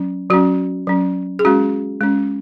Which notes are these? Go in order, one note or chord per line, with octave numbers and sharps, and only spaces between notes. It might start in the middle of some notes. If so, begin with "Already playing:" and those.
Already playing: F#3 C#4
F#3 C#4 F#4
F#3 C#4
G#4
G#3 C#4 F#4
G#3 C#4